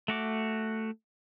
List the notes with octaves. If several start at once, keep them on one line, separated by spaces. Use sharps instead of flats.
A3 F#4 D6